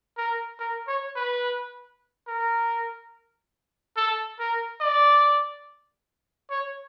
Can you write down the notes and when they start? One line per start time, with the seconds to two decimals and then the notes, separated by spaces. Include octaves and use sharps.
0.17 A#4
0.59 A#4
0.88 C#5
1.16 B4
2.27 A#4
3.97 A4
4.39 A#4
4.81 D5
6.50 C#5